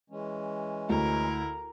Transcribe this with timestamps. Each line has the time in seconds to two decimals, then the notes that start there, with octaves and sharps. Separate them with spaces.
0.10 E3 G#3 C#4
0.89 D2 E4 A#4